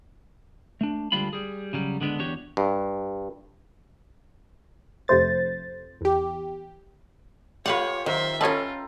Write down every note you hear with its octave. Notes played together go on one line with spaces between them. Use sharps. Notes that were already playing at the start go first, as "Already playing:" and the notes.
A3 D4
D2 G3 G#3 D4 F4 B5
G3 G#4
C#3 F#3 G3
D3 G#3 B3 D4
E2 D4 F#4 G4 C#5
G2
F2 C3 A3 C5 A6
E2 G4
A3 F4 G4 B4 C#5 F5 F#5 D6
D#3 F#3 A#4 C5 E5
C#4 F4 A4 B4 C#5 D#5 A5 A#5